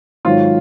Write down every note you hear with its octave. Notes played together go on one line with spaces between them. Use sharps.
G#1 G#2 D#3 F#3 F4